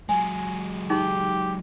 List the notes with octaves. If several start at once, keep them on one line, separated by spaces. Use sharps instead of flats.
F#3 G#3 G#5
D#4 G4 G#4 C6